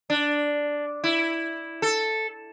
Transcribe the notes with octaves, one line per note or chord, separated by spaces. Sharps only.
D4
E4
A4